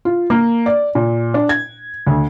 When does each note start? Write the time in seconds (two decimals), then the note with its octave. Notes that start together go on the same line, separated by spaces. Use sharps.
0.05 F4
0.30 A#3
0.66 D5
0.95 A#2
1.34 D4
1.49 G#6
2.07 D2